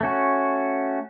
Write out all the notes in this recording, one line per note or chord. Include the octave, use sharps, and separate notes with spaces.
A3 C#4 F#4